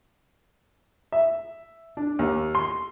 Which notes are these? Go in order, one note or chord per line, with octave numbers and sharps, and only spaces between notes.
E5
D4
D#2
C6